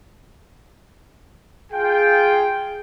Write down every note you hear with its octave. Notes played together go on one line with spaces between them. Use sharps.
F4 G#4 G5